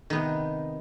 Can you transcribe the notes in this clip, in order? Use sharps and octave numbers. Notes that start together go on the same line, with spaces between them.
C3 D#3 B3